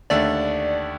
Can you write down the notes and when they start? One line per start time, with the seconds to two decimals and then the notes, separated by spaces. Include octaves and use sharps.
0.10 D#2 D3 A3 D5